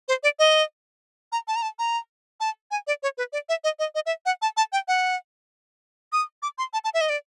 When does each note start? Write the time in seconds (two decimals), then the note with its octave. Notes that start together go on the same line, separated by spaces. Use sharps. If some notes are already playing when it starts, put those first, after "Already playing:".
0.08 C5
0.23 D5
0.39 D#5
1.32 A#5
1.48 A5
1.56 A#5
1.62 A5
1.79 A#5
2.40 A5
2.71 G#5
2.87 D5
3.03 C#5
3.18 B4
3.33 D5
3.49 E5
3.64 D#5
3.79 D#5
3.95 D#5
4.06 E5
4.26 F#5
4.42 A5
4.57 A5
4.73 G5
4.88 F#5
6.13 D#6
6.42 D6
6.58 C6
6.73 A5
6.84 A5
6.94 E5
7.01 D#5
7.09 D5